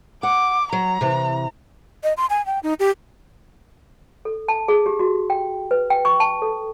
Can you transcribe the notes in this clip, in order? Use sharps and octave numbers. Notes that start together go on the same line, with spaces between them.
F#5 D6
F#3 A#5
C3 E3
D#5
C6
G#5
G5
D#4
G4
A4
A5
G#4
G4
F#4
G5
B4
G5
C#6
A5
A4